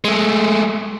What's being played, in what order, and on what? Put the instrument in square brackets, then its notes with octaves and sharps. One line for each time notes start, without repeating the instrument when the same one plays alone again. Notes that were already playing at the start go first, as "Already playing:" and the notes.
[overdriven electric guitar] G#3 A3